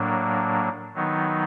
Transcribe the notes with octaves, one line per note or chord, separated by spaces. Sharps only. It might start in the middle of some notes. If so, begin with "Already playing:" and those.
Already playing: A2 F#3 A#3 D4
D#3 F#3 B3 D#4